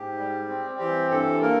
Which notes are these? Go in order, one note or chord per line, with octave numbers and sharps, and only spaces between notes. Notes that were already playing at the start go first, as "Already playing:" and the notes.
Already playing: G#2 G4
G3
C4
E3 G4
G2 A4
A#3 A#4